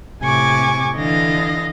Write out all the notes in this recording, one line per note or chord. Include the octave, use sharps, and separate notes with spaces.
A2 C3 G#5 C#6 D6
D3 E3 D#5 F5 A#6